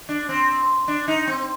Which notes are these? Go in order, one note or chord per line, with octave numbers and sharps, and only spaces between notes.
D4
C4
D4
D#4
C4